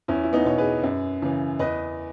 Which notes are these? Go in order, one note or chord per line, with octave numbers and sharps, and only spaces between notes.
E2 C#4 E4
E4
B3 D#4
B2 C#5
G#4 B4
F#2
C#3 E3
E2 B4 D#5